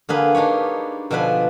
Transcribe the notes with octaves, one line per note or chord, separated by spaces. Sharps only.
D3 A#3 G#4 B4
D4 D#4 G4 C#5
B2 D3 F3 D4 B4 G#5